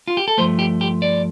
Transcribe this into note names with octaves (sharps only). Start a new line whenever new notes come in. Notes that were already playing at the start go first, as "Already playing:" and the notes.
F4
G4
A4
G2 F3 A3 C5
G4
G4
D5